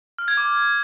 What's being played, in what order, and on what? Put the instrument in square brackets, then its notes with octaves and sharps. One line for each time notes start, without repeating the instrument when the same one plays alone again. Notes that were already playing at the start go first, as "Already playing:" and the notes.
[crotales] F6
G#6
D6